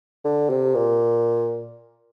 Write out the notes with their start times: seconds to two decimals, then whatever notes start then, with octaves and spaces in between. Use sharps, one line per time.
0.25 D3
0.50 C3
0.75 A#2